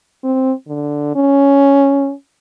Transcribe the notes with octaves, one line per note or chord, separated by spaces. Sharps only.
C4
D3
C#4